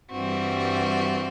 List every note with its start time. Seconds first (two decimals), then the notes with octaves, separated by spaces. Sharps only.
0.11 G2 E3 G3 C4 F#4